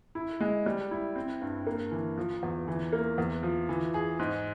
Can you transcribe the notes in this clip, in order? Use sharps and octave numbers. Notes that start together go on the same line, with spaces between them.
E4
G#3
G3
E4
C4
G2
A#3
E3
F3
E2
E3
A#3
E2
F3
E3
G#4
G#2